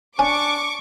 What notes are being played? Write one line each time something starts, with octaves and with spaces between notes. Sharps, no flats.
C#4 D4 C#6 D6